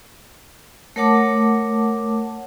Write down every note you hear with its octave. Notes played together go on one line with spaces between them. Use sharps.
A3 A#4 C#5 F#5 A5 D6